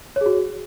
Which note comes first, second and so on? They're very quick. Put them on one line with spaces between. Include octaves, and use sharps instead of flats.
C#5 G#4 F#4